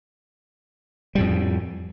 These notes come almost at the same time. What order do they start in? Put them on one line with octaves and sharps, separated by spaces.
G3 A2 F2